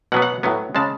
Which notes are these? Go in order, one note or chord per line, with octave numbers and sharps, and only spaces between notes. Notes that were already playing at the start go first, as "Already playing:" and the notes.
B2 F#3 B3 F#5
F#5
A2 F#3 B3
C#3 G#3 A5